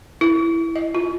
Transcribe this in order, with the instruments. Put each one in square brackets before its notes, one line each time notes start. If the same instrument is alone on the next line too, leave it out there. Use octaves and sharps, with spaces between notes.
[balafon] E4
D#5
F4